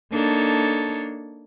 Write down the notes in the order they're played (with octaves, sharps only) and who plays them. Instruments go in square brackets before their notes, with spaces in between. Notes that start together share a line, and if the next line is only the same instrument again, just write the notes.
[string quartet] A#3 D4 D#4 A4 C#5